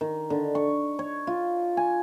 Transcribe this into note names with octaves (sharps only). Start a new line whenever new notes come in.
D#3
D3
C#6
C#5
F4
G#5